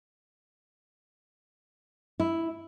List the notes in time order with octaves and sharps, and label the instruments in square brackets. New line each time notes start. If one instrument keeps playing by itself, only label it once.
[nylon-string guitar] E4